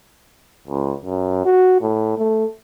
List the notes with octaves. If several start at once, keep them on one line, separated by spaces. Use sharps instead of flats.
C#2
F#2
F#4
A2
A3